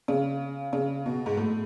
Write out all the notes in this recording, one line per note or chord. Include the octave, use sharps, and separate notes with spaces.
C#3
C#3
B2
G#2
A2